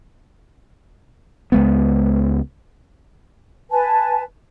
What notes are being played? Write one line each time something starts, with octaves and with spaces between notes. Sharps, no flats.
C#2 G#3 B3
B4 G#5 A5